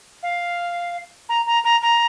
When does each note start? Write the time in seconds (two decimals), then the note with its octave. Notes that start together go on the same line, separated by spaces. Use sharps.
0.23 F5
1.29 A#5
1.46 A#5
1.64 A#5
1.82 A#5